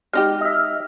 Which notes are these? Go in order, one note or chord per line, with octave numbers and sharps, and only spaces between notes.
G#3 D#4 G4 F6
D#5 E5